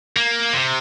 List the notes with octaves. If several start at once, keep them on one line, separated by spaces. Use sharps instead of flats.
A#3
C3